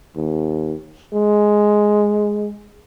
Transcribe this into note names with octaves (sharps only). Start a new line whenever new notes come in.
D#2
G#3